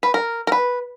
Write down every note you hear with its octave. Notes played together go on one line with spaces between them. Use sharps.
B4
A#4
A#4
B4